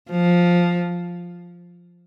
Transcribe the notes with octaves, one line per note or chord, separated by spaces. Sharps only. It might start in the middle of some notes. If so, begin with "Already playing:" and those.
F3